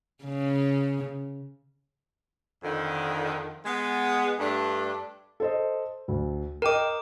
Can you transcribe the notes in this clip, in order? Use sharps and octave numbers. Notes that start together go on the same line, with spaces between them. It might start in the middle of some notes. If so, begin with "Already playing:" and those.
C#3
F2 D3 D#3
G#3 B3
G2 A3 D4
A4 C5 D#5
D2
A#4 D#5 G5 D6 D#7